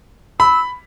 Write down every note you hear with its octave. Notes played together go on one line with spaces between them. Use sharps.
B5 E6